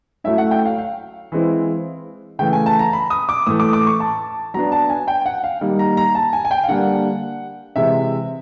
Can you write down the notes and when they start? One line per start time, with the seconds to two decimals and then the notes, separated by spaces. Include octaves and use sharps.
0.24 F#3 A3 C#4 E4 E5
0.38 F#5
0.51 G5
0.65 F5
0.78 F5
1.32 E3 G#3 C4 E4
2.39 C#3 E3 A3 G5
2.53 G#5
2.66 A5
2.79 A#5
2.93 B5
3.10 D#6
3.29 D6
3.47 A2 E3 A3 D#6
3.60 D6
3.73 D6
3.87 C#6
4.00 A5
4.54 F#3 B3 D4 A#5
4.72 A5
4.90 G#5
5.08 G5
5.26 F#5
5.44 F5
5.61 D#3 G3 A#3 D#4
5.79 A#5
5.97 A#5
6.15 A5
6.33 G#5
6.45 G#5
6.51 G5
6.64 F5
6.68 D3 G3 A#3 D4 F#5
7.76 C3 E3 G#3 E5